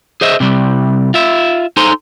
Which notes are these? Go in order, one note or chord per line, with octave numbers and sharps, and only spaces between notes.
G#4 C5 D#5 E5
C3 G3
F4 E5
D#4 A4 C5 G#5 A#5 C6